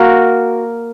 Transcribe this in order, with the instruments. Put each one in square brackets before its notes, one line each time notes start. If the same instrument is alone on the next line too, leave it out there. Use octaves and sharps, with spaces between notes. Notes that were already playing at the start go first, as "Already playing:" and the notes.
Already playing: [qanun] A#3 F#4 A#4